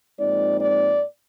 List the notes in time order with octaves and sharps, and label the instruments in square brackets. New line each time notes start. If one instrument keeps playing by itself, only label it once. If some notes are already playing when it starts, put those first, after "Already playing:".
[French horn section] A#2 F3 G#3 C4 D#4 D5
D5